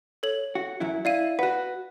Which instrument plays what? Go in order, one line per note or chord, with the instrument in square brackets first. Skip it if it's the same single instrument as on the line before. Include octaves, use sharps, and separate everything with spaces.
[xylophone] A4 C#5 F#7
[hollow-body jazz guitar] F#4
F#2 F#3 E4
[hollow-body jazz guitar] E4 [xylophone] D5 F5 D#7
[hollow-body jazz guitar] F#4 B4 [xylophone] F#5